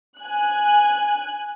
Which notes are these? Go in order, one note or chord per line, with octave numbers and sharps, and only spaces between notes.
G#5 F#6